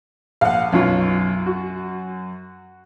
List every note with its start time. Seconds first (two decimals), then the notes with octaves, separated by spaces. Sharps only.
0.41 A#1 F5 F#5
0.72 B1 F#2 C#4 F4
1.46 F#4